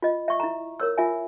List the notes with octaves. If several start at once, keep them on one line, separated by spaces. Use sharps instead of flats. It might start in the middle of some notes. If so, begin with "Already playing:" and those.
F4 D#5
E5 C#6
E4 A#5
A#4 C#5 E6
F4 E5 G#5